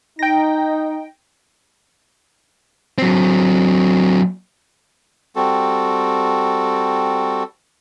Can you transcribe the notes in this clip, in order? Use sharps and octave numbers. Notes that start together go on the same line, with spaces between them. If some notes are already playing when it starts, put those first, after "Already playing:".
D#4 G5 A#6
F#3 C4
G3 C4 F#4 A4